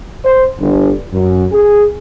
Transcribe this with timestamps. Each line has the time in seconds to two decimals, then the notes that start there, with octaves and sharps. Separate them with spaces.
0.25 C5
0.60 G1
1.13 F#2
1.52 G#4